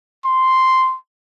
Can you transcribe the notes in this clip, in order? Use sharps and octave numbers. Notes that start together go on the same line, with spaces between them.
C6